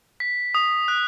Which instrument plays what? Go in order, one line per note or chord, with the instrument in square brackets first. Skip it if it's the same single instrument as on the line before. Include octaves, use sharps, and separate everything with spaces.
[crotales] B6
D#6
F#6